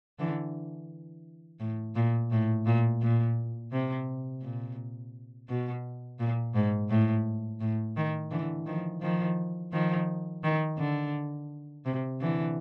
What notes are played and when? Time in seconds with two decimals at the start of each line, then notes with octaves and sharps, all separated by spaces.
0.19 D3 E3
1.60 A2
1.96 A#2
2.31 A2
2.66 A#2
3.02 A#2
3.72 C3
4.43 A#2
5.49 B2
6.19 A#2
6.55 G#2
6.90 A2
7.61 A2
7.97 D#3
8.31 D3 E3
8.67 D#3 F3
9.02 D#3 F3
9.73 D#3 F3
10.44 D#3
10.79 D3
11.86 C3
12.21 D3 E3